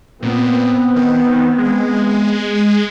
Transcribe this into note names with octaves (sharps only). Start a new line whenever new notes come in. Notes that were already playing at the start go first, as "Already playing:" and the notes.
A#2 B3 C4
D#3
G#3